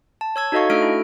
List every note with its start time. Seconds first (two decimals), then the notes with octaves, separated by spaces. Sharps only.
0.21 A5
0.36 C#5 E6 G#6
0.52 D#4 F#4 A4 D#5 F5 C#6
0.70 A3 D4 F#4 A4 F6 D7
0.82 E4